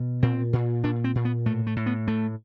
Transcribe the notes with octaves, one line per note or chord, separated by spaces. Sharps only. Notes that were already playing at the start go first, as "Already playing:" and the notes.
Already playing: B2
A#2 C4
A#2
A#2 D4
C4
A#2
B3
A2 A3
A3
A2
B3
A2 A3